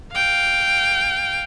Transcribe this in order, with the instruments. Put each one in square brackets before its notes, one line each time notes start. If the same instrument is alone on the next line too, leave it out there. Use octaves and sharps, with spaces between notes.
[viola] F5 G5